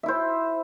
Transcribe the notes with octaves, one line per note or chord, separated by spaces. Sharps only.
E4 C5 E5